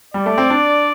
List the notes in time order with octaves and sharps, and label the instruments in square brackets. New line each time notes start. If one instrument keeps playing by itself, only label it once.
[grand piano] G3 [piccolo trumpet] D5
[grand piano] A3
C4
D4